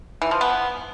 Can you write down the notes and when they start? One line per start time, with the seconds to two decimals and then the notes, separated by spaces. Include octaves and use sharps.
0.22 E3
0.31 F3
0.41 B3